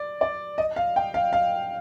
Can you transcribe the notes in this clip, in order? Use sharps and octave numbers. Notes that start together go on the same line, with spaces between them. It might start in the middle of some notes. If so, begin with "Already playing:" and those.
Already playing: D5
D5
D#5
F5
G5
F5
F5